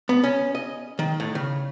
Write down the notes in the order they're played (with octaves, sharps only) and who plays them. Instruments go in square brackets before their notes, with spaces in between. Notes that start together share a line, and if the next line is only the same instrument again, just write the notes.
[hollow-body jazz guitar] B3
C#4
D#5
D#3
A2
C#3